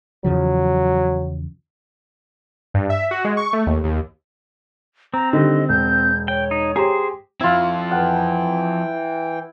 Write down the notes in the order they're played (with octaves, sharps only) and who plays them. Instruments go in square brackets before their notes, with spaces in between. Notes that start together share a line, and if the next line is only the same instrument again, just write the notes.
[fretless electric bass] E2 C#3 F3 [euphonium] F#3
[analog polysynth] G2
E5
F#4
G#3
C#6
A3
D#2
D#2
[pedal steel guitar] C4 [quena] A#5
[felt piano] D3 D#3 G3 [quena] D#5
[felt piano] E1 [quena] G6
[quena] C#5 [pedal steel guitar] G5
[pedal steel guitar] D#4
[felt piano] G4 A#5 [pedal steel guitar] G#4 C5
[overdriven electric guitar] F3 C4 [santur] E4 F4
[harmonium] E3 G5 [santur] F#5